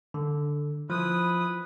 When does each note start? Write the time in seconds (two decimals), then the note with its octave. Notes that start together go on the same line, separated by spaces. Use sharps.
0.14 D3
0.90 F3 E4 B4 D#6